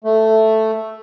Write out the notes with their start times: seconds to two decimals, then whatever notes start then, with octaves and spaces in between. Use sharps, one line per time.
0.04 A3